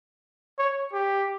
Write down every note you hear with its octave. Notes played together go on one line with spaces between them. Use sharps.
C#5
G4